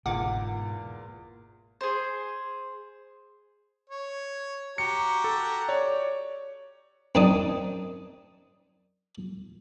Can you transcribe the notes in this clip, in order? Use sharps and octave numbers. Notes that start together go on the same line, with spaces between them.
G1 E2 G#2 B2 A#3 F4 F#5 D6
G#4 C5
C#5
F#4 G4 A#5 C#7
A4
C#5 D5
F#2 C4 D4 D#4 D5 D#6